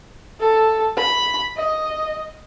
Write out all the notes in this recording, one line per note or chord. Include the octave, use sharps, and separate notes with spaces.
A4
B5
D#5